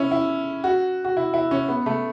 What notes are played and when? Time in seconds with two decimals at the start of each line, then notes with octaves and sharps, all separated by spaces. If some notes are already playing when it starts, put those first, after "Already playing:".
Already playing: C#4 E4
0.11 E4
0.64 F#4
1.05 F#4
1.17 E4
1.34 E4
1.51 C#4
1.69 B3
1.86 A3